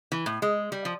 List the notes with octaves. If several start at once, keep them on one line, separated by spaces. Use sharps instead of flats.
E3
A2
G#3
G3
F3